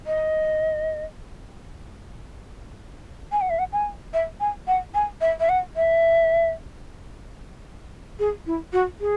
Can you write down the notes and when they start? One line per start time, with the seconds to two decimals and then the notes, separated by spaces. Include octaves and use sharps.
0.07 D#5
3.32 G#5
3.41 F#5
3.50 E5
3.59 F#5
3.73 G#5
4.13 E5
4.40 G#5
4.67 F#5
4.94 G#5
5.21 E5
5.40 E5
5.49 F#5
5.76 E5
8.19 G#4
8.47 E4
8.73 F#4
9.01 G#4